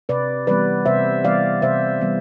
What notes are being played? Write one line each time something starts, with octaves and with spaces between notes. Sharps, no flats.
C3 B4 D5
E3 G3 B3 B4 D5
C3 C5 E5
E3 G3 B3 D5 F5
C3 C5 E5
E3 G3 B3